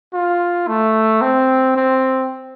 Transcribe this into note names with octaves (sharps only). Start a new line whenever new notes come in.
F4
A3
C4
C4